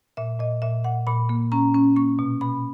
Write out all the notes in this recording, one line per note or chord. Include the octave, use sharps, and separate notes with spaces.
A#2 E5
A#2 D#5
A#2 E5
A#2 F#5
A#2 B5
A#3
C#4 A#5
C#4
A#3 C#6
B2
B2 B5